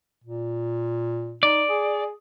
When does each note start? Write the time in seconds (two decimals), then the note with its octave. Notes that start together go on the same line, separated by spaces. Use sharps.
0.24 A#2
1.43 D#4 D5
1.69 G#4